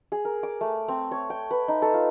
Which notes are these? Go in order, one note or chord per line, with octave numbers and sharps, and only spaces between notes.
G#4
A#4
D6
A3
C4
C#5
G5
B4
D#4
A4
F4